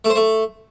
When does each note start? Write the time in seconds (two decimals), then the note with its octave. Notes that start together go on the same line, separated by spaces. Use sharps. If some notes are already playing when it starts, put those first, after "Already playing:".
0.05 A3
0.10 C5
0.15 A3